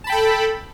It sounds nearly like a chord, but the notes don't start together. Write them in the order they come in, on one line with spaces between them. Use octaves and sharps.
A5 B5 G5 A4